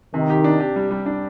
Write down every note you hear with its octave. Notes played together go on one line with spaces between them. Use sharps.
C3 D#3
G4
D4
G4
G3
G3
D4